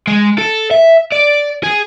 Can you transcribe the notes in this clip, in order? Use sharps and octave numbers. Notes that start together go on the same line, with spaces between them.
G#3
A4
E5
D5
G#4